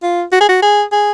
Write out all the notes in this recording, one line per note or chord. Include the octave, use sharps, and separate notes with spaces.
F4
F#4
G#4
F#4
G#4
G#4